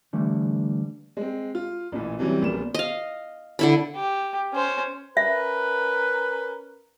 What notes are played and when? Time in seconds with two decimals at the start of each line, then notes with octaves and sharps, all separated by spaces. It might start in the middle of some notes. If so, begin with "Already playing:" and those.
0.13 D3 E3 G3 A3
1.17 G#3 C4
1.55 F4
1.92 A1 A#2 E3
2.19 C3 E3 F#3 G3 C#4
2.42 A#1 B3 A#4 E7
2.74 D#5 F5
3.59 D3 E4 B5
3.95 G4
4.53 C#4 C5
5.17 C#4 A#4 B4 E5